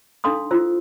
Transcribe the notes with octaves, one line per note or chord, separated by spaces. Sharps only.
D4 D#4 A4 F5 C6 D#6
E4 F4 C5 E6